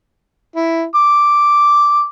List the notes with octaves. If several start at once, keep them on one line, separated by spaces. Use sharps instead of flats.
E4
D6